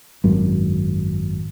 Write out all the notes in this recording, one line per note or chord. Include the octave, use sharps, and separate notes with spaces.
G#1 F#2